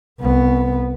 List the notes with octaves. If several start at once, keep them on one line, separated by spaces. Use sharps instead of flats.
C2 B3